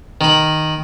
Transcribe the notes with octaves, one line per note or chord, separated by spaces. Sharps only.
D#3 B5